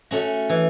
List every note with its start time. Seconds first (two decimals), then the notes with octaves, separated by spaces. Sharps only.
0.11 A3 C#4 F#4
0.49 E3